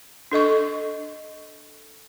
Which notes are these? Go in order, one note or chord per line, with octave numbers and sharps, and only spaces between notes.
D4 A4 D#5 C#6